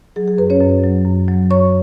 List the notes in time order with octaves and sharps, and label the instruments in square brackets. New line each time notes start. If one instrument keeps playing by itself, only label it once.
[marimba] F#3 G#4
G#4
F#2 B4
C#4 C#5
F#2
F#3
F#2
F#3
F#2 C#5 C#6